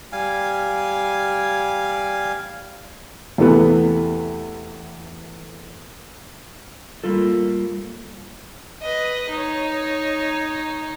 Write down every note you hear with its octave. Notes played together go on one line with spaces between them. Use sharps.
G3 F5 G#5
E2 C3 E3 A3 B3
G3 A3 A#3 F4 A4
B4 D#5
D#4 C#5